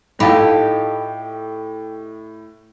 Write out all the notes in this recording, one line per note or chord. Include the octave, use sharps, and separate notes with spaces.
A2 D#4 F4 G4 A4 F5 B5